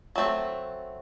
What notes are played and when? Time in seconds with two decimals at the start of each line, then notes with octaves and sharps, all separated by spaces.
0.16 F#3 A3 C4